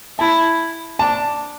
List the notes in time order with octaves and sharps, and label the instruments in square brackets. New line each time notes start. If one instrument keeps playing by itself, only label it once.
[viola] E4 [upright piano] A5
[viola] D4 [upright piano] A5